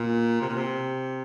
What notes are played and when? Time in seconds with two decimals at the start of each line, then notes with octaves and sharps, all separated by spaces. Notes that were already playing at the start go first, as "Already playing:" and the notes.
Already playing: A#2
0.41 C3
0.49 A#2
0.56 C3